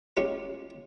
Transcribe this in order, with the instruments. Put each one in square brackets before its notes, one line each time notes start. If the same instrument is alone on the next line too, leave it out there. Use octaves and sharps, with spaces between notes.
[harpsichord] G#3 C#4 F4 G4